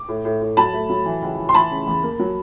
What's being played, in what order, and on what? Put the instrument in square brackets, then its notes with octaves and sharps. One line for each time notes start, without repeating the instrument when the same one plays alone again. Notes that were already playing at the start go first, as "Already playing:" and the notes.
Already playing: [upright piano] D6
A2
A2
A2
F#3 A5 B5
A3
F#3
E3
C#2
E3
C6
E3 A5 B5
C#3
E2
A#3
F#3